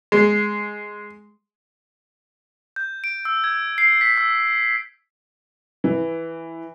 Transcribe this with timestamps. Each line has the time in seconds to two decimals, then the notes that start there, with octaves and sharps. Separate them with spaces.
0.12 G#3
2.76 G6
3.04 D7
3.25 E6
3.44 G#6
3.78 C7
4.01 B6
4.18 E6
5.84 E3